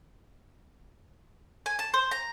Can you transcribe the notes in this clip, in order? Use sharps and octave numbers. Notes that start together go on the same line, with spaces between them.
G#5
A5
C5
A#5